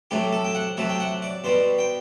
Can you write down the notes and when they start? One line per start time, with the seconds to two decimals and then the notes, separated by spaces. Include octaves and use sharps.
0.11 C3 F#3 A3 G4
0.33 A4
0.45 G5
0.55 F#5
0.77 C3 F#3 A3 E5
0.89 G5
1.00 F#5
1.22 D5
1.44 B2 G3 C5
1.78 G5